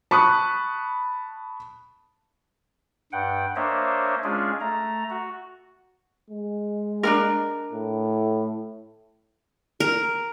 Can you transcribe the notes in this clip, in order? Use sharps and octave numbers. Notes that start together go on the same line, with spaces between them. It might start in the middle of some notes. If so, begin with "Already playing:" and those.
A5 B5 C#6 D#6 F#6
G2 F#5 G5
A#3 D4 C5 C#5 D#5 E5
G#3 C#4 D4 F4 G#4
A3 A#5
F#4
G#3
D4 D#4 A#4
A2
A#4